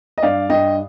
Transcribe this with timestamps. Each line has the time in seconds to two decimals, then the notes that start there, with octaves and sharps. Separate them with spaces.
0.18 D#5
0.22 G2 D5 F5
0.49 G2 D#5 G5